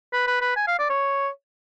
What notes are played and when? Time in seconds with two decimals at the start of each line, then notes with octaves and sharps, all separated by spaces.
0.13 B4
0.28 B4
0.42 B4
0.57 G#5
0.68 F5
0.79 D5
0.90 C#5